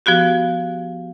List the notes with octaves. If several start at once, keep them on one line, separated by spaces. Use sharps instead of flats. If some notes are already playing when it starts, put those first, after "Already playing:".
F3 B3 F#4 G4